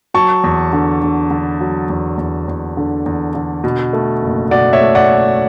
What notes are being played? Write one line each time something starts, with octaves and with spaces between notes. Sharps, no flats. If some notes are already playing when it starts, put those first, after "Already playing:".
F#3 A5 C#6
E2
D3
D3
D3
F#3
E2
E2
E2
D3
E2
D3
B2
A3
F#1
B2 D5 F#5
C#5 E5
A3
D5 F#5